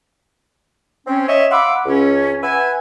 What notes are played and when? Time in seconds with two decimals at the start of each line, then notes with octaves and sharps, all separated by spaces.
1.07 C4 C#4
1.28 C#5 D#5 E5
1.51 F5 F#5 B5 C6 D6 E6
1.86 C#2 C#4
2.42 B4 E5 F#5 G#5